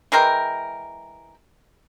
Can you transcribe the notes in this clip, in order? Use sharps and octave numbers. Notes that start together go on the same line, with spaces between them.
E3 G#3 A#4 G5